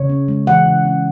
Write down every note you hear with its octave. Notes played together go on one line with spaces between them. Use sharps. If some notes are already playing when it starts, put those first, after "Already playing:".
Already playing: C#3 C#5
C#4
G#3
E3 F#5
C#3
C#4